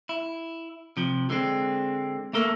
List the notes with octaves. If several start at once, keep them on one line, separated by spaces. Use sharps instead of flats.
E4
C3 F3
D3 G#3 C4
A3 A#3 A4 A#4